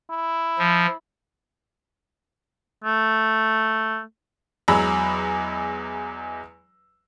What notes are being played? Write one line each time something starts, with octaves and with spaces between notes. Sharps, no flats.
E4
F3
A3
E2 F#3 G#3 A#5 B5 E6